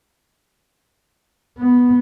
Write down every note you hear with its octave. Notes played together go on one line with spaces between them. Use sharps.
B3